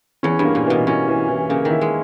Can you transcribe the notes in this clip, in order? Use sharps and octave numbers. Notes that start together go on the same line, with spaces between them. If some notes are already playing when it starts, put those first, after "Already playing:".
E2 C#4
G2
A#3
A#2
B2 E3
B2 C#4
E3
E3
C#3 A#3
D#3
E4
G#3